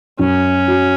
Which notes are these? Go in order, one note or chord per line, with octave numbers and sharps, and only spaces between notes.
F#2 C#4
F#3